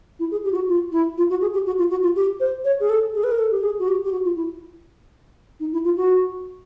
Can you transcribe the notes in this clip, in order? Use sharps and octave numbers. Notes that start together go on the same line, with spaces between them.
E4
G#4
G4
F4
F#4
F4
E4
F4
F#4
G#4
G4
F#4
F4
F#4
F4
G4
C5
C#5
G#4
A4
G#4
B4
A#4
A4
G4
G#4
F#4
G4
G4
F#4
F4
E4
D#4
E4
F4
F#4